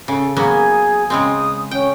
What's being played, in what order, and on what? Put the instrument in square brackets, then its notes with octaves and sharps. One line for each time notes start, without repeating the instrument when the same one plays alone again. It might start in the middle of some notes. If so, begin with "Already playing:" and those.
[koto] C#3 [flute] A4
[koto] F#3 A#3 B3 [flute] G#4
[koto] C#3 G#3 C4 [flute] D#6
[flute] C#4 [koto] G5